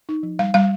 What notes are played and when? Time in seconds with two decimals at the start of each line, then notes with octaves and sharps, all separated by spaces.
0.09 D#4
0.23 F3
0.39 G3 F5
0.54 G3 F5